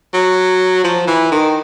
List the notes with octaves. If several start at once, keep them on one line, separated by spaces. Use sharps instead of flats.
F#3
F3
E3
D#3